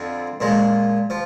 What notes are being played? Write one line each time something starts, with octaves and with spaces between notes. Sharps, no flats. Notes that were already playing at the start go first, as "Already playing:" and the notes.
Already playing: F2 D3 F3 C4
A#2 F3 G#3
F3